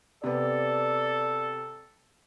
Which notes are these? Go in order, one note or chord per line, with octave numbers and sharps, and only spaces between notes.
C3 B3 A4 D5